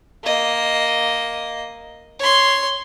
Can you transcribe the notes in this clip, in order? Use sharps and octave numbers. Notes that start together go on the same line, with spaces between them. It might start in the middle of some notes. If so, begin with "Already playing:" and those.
A#3 D#5
C#5 C6